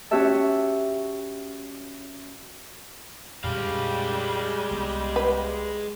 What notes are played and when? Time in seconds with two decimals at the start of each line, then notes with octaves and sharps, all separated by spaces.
0.11 C#4 F#4 G4 C#5 E5 A5
3.44 F2 A#2 G3 G#3 D4 F5
4.71 C2 B3
5.16 B4